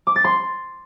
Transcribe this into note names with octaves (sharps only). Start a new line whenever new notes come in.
D6
A6
C6